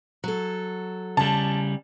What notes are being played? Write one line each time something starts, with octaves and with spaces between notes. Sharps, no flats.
F#3 A4
C#3 G3 A5